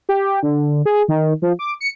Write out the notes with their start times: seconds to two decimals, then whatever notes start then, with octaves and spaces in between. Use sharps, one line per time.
0.09 G4
0.43 D3
0.86 G#4
1.09 D#3
1.42 F3
1.59 D6
1.80 C#7